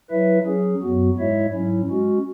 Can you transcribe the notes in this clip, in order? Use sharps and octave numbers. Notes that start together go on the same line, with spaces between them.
F#3 E4 B4 E5
F#3 C#4 G#4
F#2 F#3 B3 F#4
G#2 G#3 E4 C#5 E5
G#2 F#3 C#4 E4
G#3 C#4 F#4